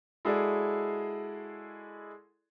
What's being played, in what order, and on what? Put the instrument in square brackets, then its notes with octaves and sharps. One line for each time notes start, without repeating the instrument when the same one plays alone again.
[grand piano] G#3 E4 F#4 G#4 A4 D5